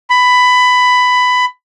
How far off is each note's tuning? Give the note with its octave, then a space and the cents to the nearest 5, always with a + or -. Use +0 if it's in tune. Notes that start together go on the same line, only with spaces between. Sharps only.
B5 +15